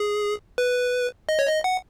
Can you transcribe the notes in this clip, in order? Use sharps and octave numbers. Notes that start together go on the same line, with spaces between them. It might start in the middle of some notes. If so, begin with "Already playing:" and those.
Already playing: G#4
B4
D#5
C#5
D#5
F#5